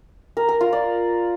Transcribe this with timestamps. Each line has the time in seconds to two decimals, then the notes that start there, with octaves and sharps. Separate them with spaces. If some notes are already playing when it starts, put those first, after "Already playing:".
0.37 A#4
0.49 A#4
0.61 F4
0.73 D5